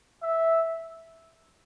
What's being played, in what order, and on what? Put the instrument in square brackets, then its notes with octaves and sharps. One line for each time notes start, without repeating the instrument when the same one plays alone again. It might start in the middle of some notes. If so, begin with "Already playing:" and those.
[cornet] E5